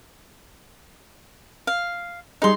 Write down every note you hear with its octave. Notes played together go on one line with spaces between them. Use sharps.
F5
G3 D#4 G#4 D#5 C6